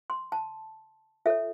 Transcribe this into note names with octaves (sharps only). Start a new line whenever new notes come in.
C6
A5
F4 A4 C#5 E5